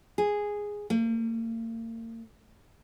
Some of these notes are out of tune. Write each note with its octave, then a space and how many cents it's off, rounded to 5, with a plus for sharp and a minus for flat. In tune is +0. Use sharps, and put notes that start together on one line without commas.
G#4 -5
A#3 -40